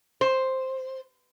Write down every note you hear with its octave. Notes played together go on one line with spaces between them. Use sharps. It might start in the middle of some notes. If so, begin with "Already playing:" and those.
C5